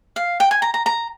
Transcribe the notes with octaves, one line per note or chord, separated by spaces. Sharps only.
F5
G5
G#5
A#5
A#5
A#5